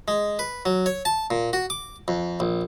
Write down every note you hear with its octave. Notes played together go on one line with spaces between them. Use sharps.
G#3
B4
F#3
C#5
A5
A#2
F#4
D6
F2
A#1